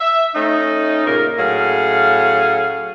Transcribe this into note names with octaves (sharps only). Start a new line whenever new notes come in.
E5
A3 C#4 D#4
A#2 C#3 A#3 A#4
A2 F#3 C#4 G#4 F5